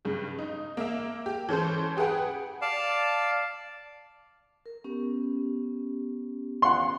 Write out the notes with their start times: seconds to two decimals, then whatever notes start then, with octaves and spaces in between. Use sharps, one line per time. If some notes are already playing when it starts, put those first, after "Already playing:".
0.05 G2 C#3
0.39 D#4
0.77 A#3 E5
1.26 G4
1.49 E3 C#4 A4 C5
1.97 G4 G#4 B4 F#5 G5
2.62 D5 F5 A5
4.66 A#4
4.84 B3 C#4 G4
6.62 F#5 C6